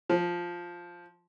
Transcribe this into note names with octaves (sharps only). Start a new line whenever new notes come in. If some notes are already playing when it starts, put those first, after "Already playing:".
F3